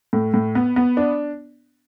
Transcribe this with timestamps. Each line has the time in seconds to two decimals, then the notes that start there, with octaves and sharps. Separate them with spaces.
0.13 A2
0.34 A2
0.55 B3
0.76 B3
0.97 D4